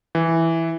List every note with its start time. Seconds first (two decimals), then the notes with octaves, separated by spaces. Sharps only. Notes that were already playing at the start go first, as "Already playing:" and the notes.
0.15 E3